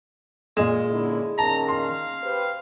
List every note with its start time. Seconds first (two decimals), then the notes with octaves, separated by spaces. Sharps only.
0.57 A#2 G#3 E7
0.91 F#2 D3 E4
1.39 A#2 D#3 C#4 A5 A#5
1.68 F5 C6
2.23 G4 B4 C5